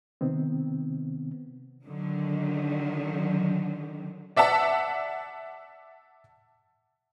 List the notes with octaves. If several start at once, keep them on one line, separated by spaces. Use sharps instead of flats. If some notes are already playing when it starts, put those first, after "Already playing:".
C3 D#3 B3 C4
D3 D#3 F#3
D5 E5 F#5 A5